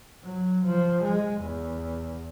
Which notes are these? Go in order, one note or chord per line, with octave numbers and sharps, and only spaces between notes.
F#3
F3
G#3
E2